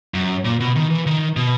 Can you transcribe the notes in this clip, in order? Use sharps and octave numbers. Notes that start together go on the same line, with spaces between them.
F#2
A#2
B2
D#3
E3
D#3
B2